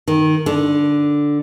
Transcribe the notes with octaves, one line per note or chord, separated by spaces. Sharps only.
D#3
D3